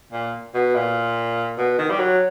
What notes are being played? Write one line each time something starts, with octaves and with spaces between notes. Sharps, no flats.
A#2
B2
A#2
B2
D#3
G3
F#3